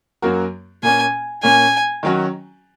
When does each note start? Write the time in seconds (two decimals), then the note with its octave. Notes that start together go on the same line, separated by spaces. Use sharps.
0.22 F#2 F#3 A#3 F#4 A#4
0.83 A#2 A#3 C#4 G#5
1.42 A#2 A#3 C#4 G#5
2.03 D#3 F#3 C#4 F#4